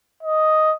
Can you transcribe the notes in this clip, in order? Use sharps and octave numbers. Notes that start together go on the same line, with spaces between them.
D#5